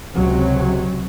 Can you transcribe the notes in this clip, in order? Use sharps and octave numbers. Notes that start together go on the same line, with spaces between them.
C#2 C3 F#3